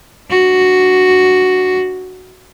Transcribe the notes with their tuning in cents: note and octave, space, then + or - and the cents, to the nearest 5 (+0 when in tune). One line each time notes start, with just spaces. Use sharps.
D4 +0 F#4 +0